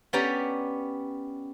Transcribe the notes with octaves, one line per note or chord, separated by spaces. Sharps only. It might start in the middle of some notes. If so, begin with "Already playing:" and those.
B3 C#4 G4 D5 A#5